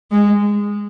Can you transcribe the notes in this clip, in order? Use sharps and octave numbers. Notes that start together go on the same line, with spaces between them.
G#3